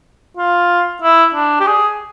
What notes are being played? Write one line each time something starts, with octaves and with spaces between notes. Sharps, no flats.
F4
E4
D4
G4
G#4